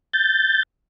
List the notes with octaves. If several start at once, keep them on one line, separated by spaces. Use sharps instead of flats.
G6 A6